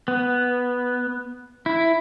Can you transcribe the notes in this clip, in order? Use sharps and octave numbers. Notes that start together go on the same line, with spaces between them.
B3
E4